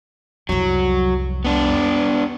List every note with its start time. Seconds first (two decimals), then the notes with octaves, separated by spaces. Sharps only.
0.49 C2 F2 F#3
1.45 B3 D4